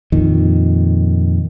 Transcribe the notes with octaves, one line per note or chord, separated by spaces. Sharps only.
F2 A#2 D#3